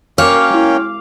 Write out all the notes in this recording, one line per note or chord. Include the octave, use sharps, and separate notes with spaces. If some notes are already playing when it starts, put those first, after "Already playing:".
A#3 C#4 F#4 A#4 C#5 F5 G5 D6
G#3 E4